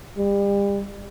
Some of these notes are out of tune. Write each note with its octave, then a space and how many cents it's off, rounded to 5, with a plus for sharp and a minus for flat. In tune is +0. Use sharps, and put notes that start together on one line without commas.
G3 +35